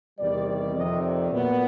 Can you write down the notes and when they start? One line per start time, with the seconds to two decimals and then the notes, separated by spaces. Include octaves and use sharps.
0.19 E2 C3 D#3 G3 D5
0.46 D5
0.75 F2 C3 D#3 D#5
1.03 D5
1.31 A#2 F#3 B3